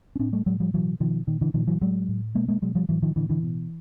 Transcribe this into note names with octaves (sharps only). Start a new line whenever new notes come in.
C#4
A2 C4 D4
G3 A3
A2 F#3 G#3
F3 G3
B2 E3 F#3
B2 D#3 F3
A#2 D#3
D3 E3
A#2 D#3 F3
E3 F#3
A2 F#3 G#3
A2
B2 G#3 A#3
G#3 A#3
B2 F#3 G#3
F3 G3
A2 E3 F#3
D#3 F3
A2 D3 E3
D3 E3
B2